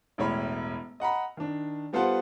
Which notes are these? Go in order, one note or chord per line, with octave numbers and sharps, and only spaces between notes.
E1 A2 E4 C#5 B5
D#5 F#5 A#5 B5
D#3 D4
G3 B3 F4 A4 C5 F#5